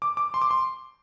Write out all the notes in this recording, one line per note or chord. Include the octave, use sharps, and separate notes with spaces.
D6
D6
C6
D6
C6